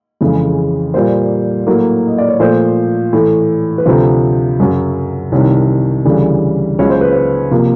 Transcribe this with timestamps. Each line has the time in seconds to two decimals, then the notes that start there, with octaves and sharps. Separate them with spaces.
0.21 F2 C#3 E3 G#3
0.94 A#2 G3 A#3 C5
1.67 A2 F#3 A#3
2.07 D#5
2.18 D5
2.29 C#5
2.39 A#2 F3 A3 C5
3.13 A2 E3 A3
3.78 B4
3.86 D2 C3 F3 C5
4.60 F#2 C#3 F#3
5.32 C2 C3 D#3 C#5
6.05 D2 C#3 E3 G3
6.79 C#2 C#3 F#3 C#5
6.90 C5
7.01 B4
7.12 C5
7.51 C3 F3 A#3